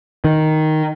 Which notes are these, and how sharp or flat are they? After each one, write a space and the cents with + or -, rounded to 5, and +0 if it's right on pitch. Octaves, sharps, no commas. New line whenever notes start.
D#3 +0